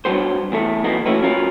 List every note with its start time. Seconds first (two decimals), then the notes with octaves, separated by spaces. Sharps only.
0.05 G2 C3 F#3 B3 C5
0.52 E2 A2 A3
0.84 E2 B2 D#3 A#3 B3 D#4
1.06 E3 A3 C#4 E4 F#4 B4
1.22 F#3 C#4 F4 A#4 B4